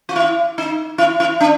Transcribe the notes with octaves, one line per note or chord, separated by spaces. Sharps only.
F4
E4
D#4
E4
E4
D4